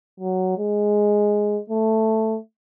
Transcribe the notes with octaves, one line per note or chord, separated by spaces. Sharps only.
F#3
G#3
A3